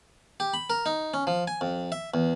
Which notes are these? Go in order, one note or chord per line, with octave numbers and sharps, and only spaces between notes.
G4
B5
A#4
D#4
C#4
F3
G#5
F2
E5
E2